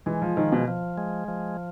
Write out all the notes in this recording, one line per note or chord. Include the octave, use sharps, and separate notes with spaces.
E3 G#3
F3
D#3 F3
B2
F3
G#3
F3